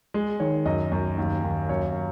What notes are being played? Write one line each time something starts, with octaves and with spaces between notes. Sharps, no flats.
G#3
D#3 C#5
F#2 D#5
F#2
D#2
D#2
F#2 C#5